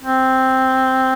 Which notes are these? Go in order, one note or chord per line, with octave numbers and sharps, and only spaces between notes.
C4